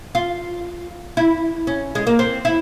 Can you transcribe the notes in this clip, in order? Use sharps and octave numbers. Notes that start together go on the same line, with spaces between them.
F4
E4
C#4
G#3
A#3
C4
E4